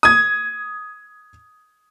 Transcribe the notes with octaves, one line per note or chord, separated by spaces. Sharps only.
D#6 G#6